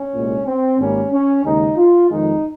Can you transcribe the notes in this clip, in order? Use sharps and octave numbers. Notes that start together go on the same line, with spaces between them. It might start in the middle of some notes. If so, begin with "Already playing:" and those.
Already playing: C#4
C2 A#2 G#3
C4
G#1 G#2 G3 A#3 C#4
C#4
D#2 C#3 G#3 D#4
F4
F2 D#3 G#3 D#4